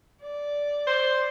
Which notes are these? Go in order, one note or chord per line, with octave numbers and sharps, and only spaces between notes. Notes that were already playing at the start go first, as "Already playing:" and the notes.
D5
C5